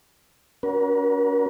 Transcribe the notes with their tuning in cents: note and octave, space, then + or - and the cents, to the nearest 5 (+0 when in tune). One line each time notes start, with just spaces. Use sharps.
C#4 +40 F#4 +0 A#4 +40